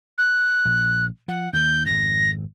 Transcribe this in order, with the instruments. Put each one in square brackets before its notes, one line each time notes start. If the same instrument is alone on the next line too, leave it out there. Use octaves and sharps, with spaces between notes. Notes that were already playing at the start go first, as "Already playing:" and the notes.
[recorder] F#6
[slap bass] A#1
[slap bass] F3 [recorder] F#5
[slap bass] D#2 D#3 [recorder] G6
[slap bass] G#1 F2 [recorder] A#6